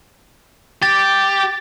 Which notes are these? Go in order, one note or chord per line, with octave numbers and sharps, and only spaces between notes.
G4 A6